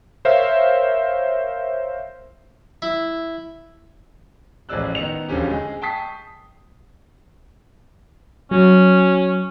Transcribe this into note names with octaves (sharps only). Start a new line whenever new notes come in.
A#4 C5 C#5 E5 F5
E4
A1 F3 G#3 D5 E6 F#6
D#3 B3 D#5 C#7 F7
E1 D3 F3 C#4 G4
G#3 G#4
G5 A5 C#6 D#6 B6 C7
F#3 C#4